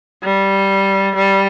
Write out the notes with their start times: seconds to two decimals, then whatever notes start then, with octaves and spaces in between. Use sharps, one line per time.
0.23 G3
1.16 G3